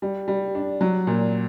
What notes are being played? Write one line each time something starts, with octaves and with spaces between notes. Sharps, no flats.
G3
G3
D4
F#3
A#2